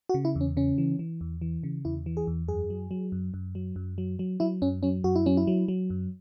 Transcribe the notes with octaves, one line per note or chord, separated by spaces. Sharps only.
F#4
C#3
E4
E2
C#4
C#3 C#4
E3
E3
E2
E3
C#3
E2 E4
E3
G#4
E2
F#2 G#4
F#3
F#3
F#2
F#2
F#3
F#2
F#3
F#3
F#3 E4
F#2 C#4
F#3 C#4
F#2 F#4
E4
F#3 C#4
E4
F#3
F#3
F#2